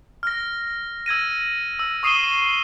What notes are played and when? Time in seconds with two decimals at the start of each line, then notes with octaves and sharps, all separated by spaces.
0.23 F6 A#6
1.06 E6 G#6 A#6 D#7
1.79 E6
2.03 C#6 D#6 C7 D#7 E7 G7